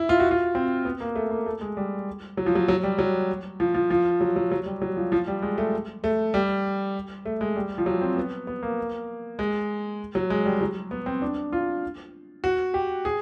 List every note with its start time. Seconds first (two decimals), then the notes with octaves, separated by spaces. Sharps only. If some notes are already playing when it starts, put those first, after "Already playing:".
Already playing: E4
0.09 F4
0.20 F#4
0.31 F4
0.55 C4
0.85 B3
1.00 A#3
1.16 A3
1.31 A#3
1.46 A3
1.61 G#3
1.77 G3
2.37 F#3
2.46 F3
2.55 F#3
2.68 F#3
2.83 G3
2.98 F#3
3.60 F3
3.74 F3
3.90 F3
4.21 F#3
4.36 F#3
4.51 F#3
4.66 G3
4.82 F#3
4.97 F3
5.12 F3
5.27 G3
5.42 G#3
5.58 A3
6.04 A3
6.34 G3
7.25 A3
7.41 G#3
7.56 G3
7.78 F3
7.86 F#3
8.01 C4
8.16 B3
8.47 B3
8.63 A#3
9.39 G#3
10.15 F#3
10.30 G#3
10.46 G3
10.61 F#3
10.91 B3
11.06 C4
11.22 D4
11.52 F4
12.44 F#4
12.74 G4
13.05 G#4